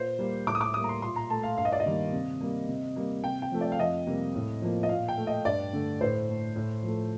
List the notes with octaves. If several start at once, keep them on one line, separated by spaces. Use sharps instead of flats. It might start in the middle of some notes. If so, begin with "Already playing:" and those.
Already playing: A#2 C5
G3 A#3
A2 D6
D#6
D6
G3 A#3 D#6
A#5
C6
A#2 C6
A#5
A3 A5
F5
G2 F5
D#5
D5
D#5
D#3 G3 A#3
C3
G3 A#3
C3
G3 A#3
C3 G5
G5
F3 A3
D5
F5
F2 D#5
C3 G3 A#3
A2
F3 A#3
D#5
A#2 F5
G5
A3
D#5
G2 D5
D3 A3
A2 C5
A3
A2
F3
A3